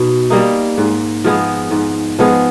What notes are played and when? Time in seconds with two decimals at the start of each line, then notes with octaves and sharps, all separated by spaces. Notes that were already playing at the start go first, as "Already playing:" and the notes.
Already playing: B2 D#4
0.30 G3 A#3 D#4
0.78 G#2
1.24 F3 G#3 B3
1.71 G#2
2.19 F3 G#3 B3